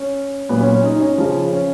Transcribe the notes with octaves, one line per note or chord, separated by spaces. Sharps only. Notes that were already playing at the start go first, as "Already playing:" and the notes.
Already playing: C#4
A#2 F#3 B3
C#4
C#4
D#4
D#4
C#4
C#3 F3
C#4